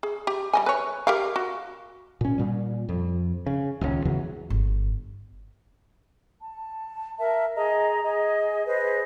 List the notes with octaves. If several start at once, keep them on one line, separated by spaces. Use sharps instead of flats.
G#4
G4
G3 D#5 G#5
B4 C#5
G4 A#4 F5
F#4
A#2 C#4
A#2 G3
F2
C#3
D#1 C#2 D#3 C#4
E2 C#3 E3 F#3
G1
A5
A#4 E5 A5
G#4 D#5 A#5
G#4 D#5
G#4 B4 C5 D#5